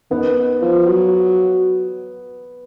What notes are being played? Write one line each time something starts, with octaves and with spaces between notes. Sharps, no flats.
D#3 B3
F3
F#3